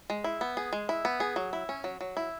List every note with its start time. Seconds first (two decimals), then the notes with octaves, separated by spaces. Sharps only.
0.10 G#3
0.24 E4
0.41 B3
0.57 G#4
0.73 G#3
0.89 E4
1.05 B3
1.20 G#4
1.36 F#3
1.53 E4
1.69 C#4
1.84 F#3
2.01 F#3
2.17 E4